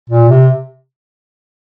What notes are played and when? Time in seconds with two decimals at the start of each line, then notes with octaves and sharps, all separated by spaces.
0.10 A#2
0.29 C3